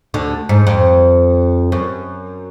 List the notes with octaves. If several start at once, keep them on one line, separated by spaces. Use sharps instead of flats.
D2 D3
G#2
F2
F#2